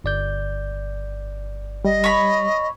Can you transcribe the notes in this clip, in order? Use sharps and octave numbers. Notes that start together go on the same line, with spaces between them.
G1 D5 G6
G3 D#5
C#5 B5